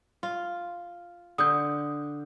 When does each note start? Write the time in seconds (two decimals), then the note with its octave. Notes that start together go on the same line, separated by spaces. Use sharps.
0.23 F4
1.38 D3 D#6 G6